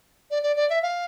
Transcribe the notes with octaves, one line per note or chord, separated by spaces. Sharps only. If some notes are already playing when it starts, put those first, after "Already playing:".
D5
D5
D5
E5
F5